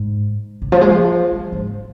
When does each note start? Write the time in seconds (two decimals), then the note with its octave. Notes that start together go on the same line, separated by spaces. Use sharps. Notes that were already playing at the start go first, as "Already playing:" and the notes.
Already playing: G#2
0.62 C3
0.72 F3
0.81 G#3
0.91 F3
1.32 F3
1.52 G#2